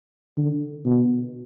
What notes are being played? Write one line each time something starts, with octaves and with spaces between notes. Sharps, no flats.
D3
B2